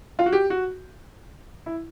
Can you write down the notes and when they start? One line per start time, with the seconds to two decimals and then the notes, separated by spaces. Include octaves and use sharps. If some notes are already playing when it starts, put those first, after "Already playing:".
0.19 F4
0.26 F#4
0.32 G4
0.50 F#4
1.66 E4